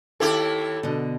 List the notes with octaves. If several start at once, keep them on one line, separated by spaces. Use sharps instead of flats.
D#2 E4 G4 A4
B2 D3